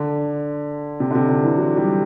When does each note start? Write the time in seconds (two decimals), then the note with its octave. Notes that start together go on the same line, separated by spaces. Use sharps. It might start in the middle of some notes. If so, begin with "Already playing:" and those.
Already playing: D3
1.00 C3
1.10 D3
1.15 C3
1.28 D3
1.43 E3
1.57 F#3
1.76 G3